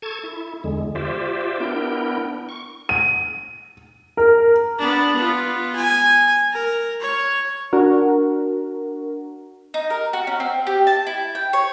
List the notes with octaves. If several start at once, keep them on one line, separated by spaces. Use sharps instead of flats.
A4 A5 C#6 G#6
E4
E2 D3 G#3
F4 G4 C5 D5 E5
B3 D4 E4 A#4 G5
C#6
D#7
A#4
B3 D4
B3 F4
G#5
A#4
C#5
D4 F#4 A#4
D#4
A#4
F#4
C#4
C4
G4
A5
E4
G5
C#5